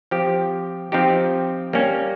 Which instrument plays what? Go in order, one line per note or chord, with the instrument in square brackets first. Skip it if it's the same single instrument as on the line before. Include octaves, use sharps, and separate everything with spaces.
[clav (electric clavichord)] F3 C4 G4
F3 C4 D#4 G4
G3 A#3 C#4